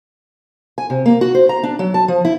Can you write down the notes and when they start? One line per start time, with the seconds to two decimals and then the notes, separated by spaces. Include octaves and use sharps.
0.78 G#5
0.90 C3
1.06 A#3
1.21 F#4
1.35 C5
1.49 A#5
1.63 D4
1.79 F#3
1.94 A5
2.08 F3
2.25 E4